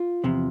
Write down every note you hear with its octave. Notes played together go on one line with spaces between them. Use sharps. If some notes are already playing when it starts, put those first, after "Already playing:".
Already playing: F4
E2 C3 F3